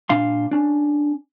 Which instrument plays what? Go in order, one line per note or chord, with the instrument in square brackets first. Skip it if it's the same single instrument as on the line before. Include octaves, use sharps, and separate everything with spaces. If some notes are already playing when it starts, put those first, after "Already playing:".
[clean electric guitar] A#2 D4 F5 C6
C#4 D4